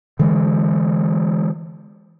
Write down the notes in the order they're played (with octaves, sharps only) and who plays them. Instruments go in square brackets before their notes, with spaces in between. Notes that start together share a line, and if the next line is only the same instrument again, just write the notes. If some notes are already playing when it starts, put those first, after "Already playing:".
[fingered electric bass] D3 E3 G#3